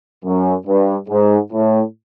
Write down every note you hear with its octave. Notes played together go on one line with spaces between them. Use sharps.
F#2
G2
G#2
A2